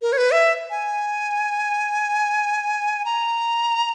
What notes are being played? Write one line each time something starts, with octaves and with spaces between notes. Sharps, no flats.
A#4
C#5
B4
E5
G#5
A#5